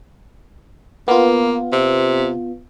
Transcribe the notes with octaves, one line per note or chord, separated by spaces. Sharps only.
A#3 B3 F4
C3